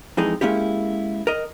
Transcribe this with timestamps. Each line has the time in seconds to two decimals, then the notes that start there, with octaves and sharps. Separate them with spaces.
0.17 F2 E3 G#3 D#4
0.41 G#3 A#3 C#4 E4 G4
1.27 A#4 D#5